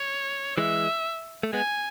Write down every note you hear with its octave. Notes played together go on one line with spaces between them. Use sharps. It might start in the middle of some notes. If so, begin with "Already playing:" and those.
Already playing: C#5
E3 G#3 E5
A3
G#3 B3 G#5